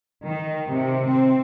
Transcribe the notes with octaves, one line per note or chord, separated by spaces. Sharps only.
D#3
C3
C4